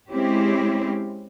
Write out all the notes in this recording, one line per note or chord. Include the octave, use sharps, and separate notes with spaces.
G#3 C4 C#4 E4 G4